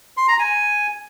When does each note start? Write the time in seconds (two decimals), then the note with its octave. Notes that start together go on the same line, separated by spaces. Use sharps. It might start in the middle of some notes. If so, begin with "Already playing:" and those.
0.17 C6
0.28 A#5
0.39 G#5